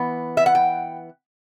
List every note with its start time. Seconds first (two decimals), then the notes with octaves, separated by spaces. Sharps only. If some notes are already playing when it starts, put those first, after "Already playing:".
Already playing: E3 B3
0.37 E5
0.46 F#5
0.55 G5